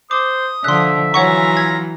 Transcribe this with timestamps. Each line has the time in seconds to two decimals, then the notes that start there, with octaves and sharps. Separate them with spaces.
0.11 C5 D6 D#6
0.64 D3 F3 E5 C6 F#6
1.14 E3 F#3 F4 C#5 F#5 G#5 A#5 C#6
1.57 G#6